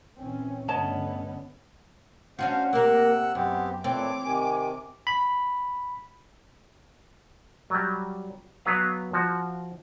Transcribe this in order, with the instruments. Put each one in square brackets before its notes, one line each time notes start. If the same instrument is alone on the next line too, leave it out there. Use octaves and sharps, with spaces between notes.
[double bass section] A#2 E3 C#4 [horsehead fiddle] C4
[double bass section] G2 D3 A3 [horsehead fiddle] B3 C#4 [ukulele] C#5 D#5 A5
[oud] C#4 D4 F#4 [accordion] C5 F5 [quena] F#5
[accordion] C3 E6 F#6 [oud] A#3 A#4
[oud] F#2 [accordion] B3 C4 G4
[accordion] A#2 E3 A4 [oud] C4 [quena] C#5 [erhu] D6
[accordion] C3 D#3 [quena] G#5
[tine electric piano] B5
[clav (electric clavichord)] F#3 G3
F#3 B3 B4 F5
F3 F#4